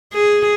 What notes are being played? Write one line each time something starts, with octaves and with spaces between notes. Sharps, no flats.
G#4